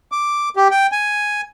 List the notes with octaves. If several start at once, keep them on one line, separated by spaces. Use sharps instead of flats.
D6
G4
G5
G#5